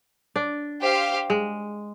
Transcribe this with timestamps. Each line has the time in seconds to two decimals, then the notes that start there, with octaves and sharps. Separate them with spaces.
0.36 D4
0.82 G4 C5 F5
1.30 G#3